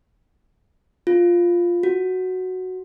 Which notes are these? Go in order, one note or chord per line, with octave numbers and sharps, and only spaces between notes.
F4
F#4